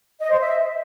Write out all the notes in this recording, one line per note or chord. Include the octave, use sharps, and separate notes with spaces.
D#5
C5
E5